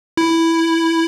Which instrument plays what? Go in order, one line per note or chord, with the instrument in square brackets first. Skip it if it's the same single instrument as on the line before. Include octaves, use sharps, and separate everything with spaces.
[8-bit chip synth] E4